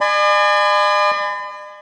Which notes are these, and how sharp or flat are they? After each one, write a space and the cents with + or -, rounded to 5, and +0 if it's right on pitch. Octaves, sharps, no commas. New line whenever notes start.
D5 +45 G#5 +0 B5 +40